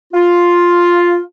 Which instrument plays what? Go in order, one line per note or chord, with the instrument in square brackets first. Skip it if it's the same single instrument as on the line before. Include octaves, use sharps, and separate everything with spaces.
[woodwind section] F4